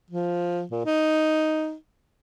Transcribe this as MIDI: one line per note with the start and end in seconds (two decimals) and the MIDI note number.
0.10 0.63 53
0.71 0.81 46
0.85 1.75 63